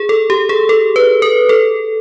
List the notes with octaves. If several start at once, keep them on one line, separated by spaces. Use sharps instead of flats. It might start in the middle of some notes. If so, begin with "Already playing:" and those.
Already playing: G#4
A4
G4
G#4
A4
B4
A#4
A4